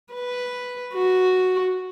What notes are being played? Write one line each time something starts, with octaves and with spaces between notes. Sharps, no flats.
B4
F#4